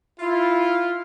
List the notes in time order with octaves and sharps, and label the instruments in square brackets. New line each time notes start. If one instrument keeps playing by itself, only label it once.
[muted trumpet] E4 [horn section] F4